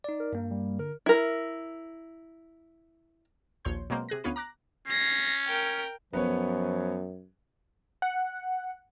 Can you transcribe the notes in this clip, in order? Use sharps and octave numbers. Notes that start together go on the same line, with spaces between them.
D#4 D5
A#4
G2 A#3
G3
D3 A#4
E4 A#4
A#1 D#2 C#5 C6 G6
B2 F#3 G#3 A#3 C4
C3 G#4 F#6 A#6
D2 B3 C#4 F4 B4 D#7
A#5 D6 F#6 A#6
C#4 A#6 C7
A#4 G5
F#2 F3 B3 B4 C#5
F#5